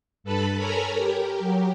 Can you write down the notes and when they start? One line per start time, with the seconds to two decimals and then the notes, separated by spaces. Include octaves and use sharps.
0.24 G2 A4 B4 A5 B5
0.58 A4 A#4 C#5 G#5 A#5 B5
0.95 G4 A#4
1.35 F#3 G4